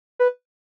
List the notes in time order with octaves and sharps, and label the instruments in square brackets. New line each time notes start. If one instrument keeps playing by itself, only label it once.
[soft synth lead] B4